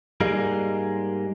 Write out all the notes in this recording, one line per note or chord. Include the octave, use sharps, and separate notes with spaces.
G#2 G3 G#3 A#3